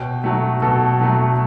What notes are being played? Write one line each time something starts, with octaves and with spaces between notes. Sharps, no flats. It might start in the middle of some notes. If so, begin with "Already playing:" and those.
Already playing: B2 G5
F#3 A3
B2 A4
F#3 A3